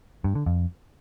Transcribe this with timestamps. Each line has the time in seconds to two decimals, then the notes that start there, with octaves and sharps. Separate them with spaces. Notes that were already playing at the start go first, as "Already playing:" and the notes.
0.24 G2
0.35 D3
0.46 F2